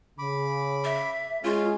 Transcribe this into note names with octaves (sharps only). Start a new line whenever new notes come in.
C#3 B5 D6
E5
G#3 C#4 F4 G#4 F5